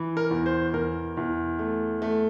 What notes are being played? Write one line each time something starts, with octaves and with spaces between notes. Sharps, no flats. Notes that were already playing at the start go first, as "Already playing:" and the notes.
Already playing: E3
A#4
E2
C5
E2 A#4
E2
A3
A3